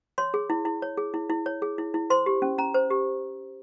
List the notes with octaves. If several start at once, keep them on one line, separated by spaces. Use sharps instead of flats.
C#5 C6
G#4
E4
E4
C#5
G#4
E4
E4
C#5
G#4
E4
E4
C5 C6
G4
C#4
C#4 A#5
C5
G4